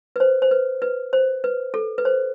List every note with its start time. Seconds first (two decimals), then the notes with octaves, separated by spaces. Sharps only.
0.16 B4
0.20 C5
0.42 C5
0.51 B4
0.82 B4
1.13 C5
1.44 B4
1.74 A4
1.98 B4
2.05 C5